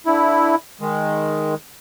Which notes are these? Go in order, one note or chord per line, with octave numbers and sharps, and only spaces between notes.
D3 E4
D#3 G#3